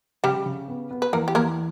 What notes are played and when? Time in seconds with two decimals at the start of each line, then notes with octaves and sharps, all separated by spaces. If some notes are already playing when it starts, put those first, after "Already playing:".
0.24 C#3 G3 G4
0.46 C#3
0.68 B3
0.91 B3
1.02 B4
1.13 E2 A#3 A#4
1.28 G4
1.35 E2 A#3 A#4